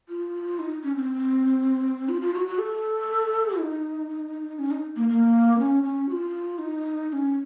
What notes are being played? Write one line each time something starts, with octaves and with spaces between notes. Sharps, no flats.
F4
D#4
C#4
C4
F4
F4
F#4
F#4
A4
D#4
C#4
D#4
A#3
A#3
C#4
C#4
F#4
F4
D#4
D#4
C#4